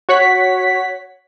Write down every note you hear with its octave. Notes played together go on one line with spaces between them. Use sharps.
F#4 C#5 F#5 B6